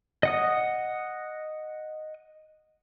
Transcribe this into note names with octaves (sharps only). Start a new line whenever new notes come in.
D#5 F#5 D#6